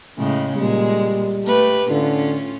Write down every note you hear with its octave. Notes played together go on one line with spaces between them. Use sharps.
A2 C#3 G#3
A#2 G3 G#3
A3 G4 B4
A2 D3 C#4 F4